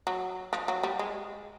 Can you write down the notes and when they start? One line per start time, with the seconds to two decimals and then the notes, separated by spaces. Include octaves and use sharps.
0.07 F#3
0.53 F3
0.68 F#3
0.83 G3
0.99 G#3